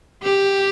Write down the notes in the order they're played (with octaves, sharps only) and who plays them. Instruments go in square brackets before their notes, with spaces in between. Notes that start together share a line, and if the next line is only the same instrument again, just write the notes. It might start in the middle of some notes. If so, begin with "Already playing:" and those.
[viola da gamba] G4